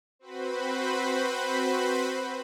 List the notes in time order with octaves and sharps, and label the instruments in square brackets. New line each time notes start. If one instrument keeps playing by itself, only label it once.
[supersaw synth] C4 F#4 B4 C5 B5